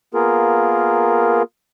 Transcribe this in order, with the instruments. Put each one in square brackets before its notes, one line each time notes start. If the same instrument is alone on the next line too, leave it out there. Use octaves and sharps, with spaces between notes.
[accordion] A#3 B3 F4 G#4 A#4